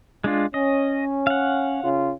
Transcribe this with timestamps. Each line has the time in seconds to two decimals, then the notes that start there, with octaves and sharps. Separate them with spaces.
0.24 G#3 D4 F4
0.54 C#4 D#5
1.27 F5 F#5
1.83 C#3 C#4 F4